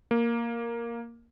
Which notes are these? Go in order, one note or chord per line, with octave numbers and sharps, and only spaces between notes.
A#3